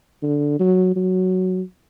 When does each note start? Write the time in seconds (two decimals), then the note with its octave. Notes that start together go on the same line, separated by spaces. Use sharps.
0.22 D3
0.59 F#3
0.96 F#3